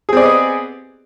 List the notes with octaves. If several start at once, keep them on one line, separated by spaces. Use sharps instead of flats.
B3 C4 G#4 D5 D#5